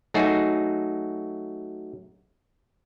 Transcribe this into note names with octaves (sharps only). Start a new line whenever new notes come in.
F#3 A3 D#4 F#4 G#4